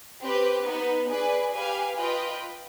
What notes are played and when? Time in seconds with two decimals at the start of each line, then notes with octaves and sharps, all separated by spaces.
0.21 C4 G4 B4
0.64 B3 D#4 B4
1.09 G#4 B4 D5 G#5
1.52 G4 B4 F5 G#5
1.97 F4 B4 D#5 G5